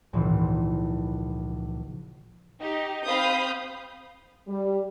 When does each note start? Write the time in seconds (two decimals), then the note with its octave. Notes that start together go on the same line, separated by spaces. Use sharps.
0.13 G#1 C#2 A#2 E3 F3
2.60 D#4 G4
3.04 C4 C5 F5 B5 D#6 G6
4.47 G3